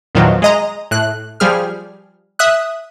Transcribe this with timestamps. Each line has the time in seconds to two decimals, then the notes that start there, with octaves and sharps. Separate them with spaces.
0.15 E2 A#2 D#3 F3 F#3
0.42 G#3 D#5 A#5
0.91 A2 F#6
1.40 F3 G3 G#4 F6
2.39 E5 D#6 F#6